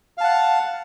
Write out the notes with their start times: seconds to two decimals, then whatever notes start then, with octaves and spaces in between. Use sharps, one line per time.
0.18 F5
0.21 A5
0.24 F#5